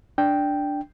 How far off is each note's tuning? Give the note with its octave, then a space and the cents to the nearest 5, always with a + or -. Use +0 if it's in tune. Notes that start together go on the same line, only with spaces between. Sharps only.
D4 +0 G5 +0